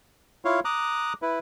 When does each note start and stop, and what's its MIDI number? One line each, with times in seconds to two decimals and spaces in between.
0.45 0.60 64
0.45 0.60 65
0.45 0.60 73
0.45 0.60 77
0.65 1.13 82
0.65 1.13 86
0.65 1.13 87
0.65 1.13 90
1.22 1.39 64
1.22 1.39 71